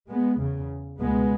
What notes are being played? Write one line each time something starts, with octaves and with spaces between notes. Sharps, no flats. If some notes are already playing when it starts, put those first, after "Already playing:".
G#3 B3
E2 C#3
C#2 B2 G#3 B3